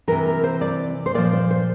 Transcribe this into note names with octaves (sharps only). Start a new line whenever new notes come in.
C3 E3 A#4
A#4
C5
D5
C5
A#2 F3 D5
C5
C5